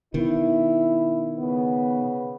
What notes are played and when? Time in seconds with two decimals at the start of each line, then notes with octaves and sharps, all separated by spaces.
0.14 B2 D#3 E4
1.37 C#3 B3